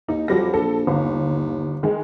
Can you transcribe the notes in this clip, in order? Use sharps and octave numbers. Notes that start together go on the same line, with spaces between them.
D#2 D#4
F2 F#3 G3 A#6
A#1 A4
G1 D#2
D#3 G#3